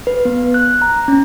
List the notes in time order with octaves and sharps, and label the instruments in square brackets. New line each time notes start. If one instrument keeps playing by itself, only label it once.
[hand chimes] B4
B3
F#6
A#5
C#4